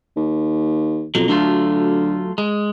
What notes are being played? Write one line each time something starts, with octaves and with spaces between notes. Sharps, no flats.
D#2
F2 B2 F#3
D2 F#3 A3 F4
G#3